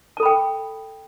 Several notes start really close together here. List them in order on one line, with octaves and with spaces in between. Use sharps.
A5 A4 B5 G5